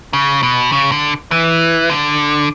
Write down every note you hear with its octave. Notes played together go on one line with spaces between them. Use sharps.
C#3
B2
C#3
D3
E3
D3